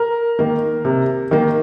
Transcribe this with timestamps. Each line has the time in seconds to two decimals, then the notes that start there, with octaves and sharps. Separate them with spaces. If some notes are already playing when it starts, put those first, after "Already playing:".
Already playing: A#4
0.39 D#3 A#3
0.85 C3
1.31 D#3 A#3